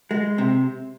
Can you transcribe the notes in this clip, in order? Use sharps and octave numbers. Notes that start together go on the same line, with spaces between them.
G#3
C3